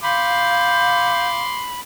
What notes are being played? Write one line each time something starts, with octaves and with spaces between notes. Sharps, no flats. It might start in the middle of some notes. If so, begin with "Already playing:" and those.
F5 B5 C6 D6 G6